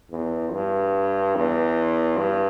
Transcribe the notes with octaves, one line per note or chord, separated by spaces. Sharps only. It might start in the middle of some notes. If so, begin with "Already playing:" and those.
E2
G2
E2
G2